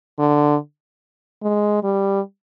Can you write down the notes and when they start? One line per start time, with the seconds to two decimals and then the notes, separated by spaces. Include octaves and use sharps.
0.19 D3
1.42 G#3
1.83 G3